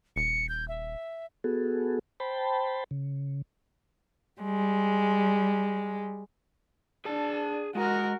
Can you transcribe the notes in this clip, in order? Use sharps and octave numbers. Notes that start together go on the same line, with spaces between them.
D#1 C#7
G6
E5
B3 F#4 G#4 A4
C5 G5 A5 B5
C#3
G3 G#3
D4 G#4 A5
G#3 F#4 A#4